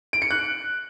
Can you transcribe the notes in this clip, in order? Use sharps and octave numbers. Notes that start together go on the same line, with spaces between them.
D7
C#7
F#6